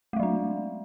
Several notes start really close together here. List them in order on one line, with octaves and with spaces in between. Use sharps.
A3 G#3 F#3 D4